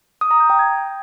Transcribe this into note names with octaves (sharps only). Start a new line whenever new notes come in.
D#6
A#5
G6
G5
G#6